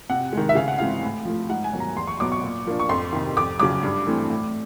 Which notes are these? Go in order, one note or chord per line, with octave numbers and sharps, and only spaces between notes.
C3 F#5
D#3 G#3
E5
C#3 F5
F#5
E3 G#3 C4 F5
A2
F3 A3
G#2 F#5
G#5
D#3 F#3 B3
A#5
E2 C6
C#6
B2 F#3 B3 D6
C#6
A#2
F3 A#3 D4
C#6
F2 C6
C3 D#3
F2 D6
C#3 F#3 D6
G2
E3 A3 C4
A2